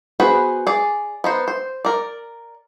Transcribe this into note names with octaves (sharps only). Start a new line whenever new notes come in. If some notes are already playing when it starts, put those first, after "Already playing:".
B3 F#4 G#4 B4 C5
G#4 D5
B3 D#4 C5
C5
A#4 D5